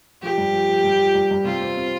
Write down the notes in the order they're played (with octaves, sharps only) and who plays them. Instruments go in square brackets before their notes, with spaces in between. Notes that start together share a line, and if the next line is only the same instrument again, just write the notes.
[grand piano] F3 [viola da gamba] G4
[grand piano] G2
F3
F3
G2
F3
G2
G2
[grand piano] C3 [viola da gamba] F4
[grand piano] C4
C4